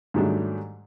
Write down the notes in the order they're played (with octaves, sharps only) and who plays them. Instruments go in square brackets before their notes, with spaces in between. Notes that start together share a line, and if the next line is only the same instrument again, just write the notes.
[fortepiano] G#2 D#3 F#3 G3 A3 D4